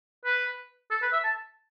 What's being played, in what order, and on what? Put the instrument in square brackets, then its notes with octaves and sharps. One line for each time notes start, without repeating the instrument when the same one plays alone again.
[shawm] B4
A4
B4
E5
A5